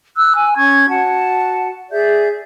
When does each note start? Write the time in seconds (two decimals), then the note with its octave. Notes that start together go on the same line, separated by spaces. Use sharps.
0.16 E6 F#6
0.35 G#5
0.56 C#4 C#6 G#6
0.89 F#4 F#5 A5
1.91 G#4 D5 E5 G6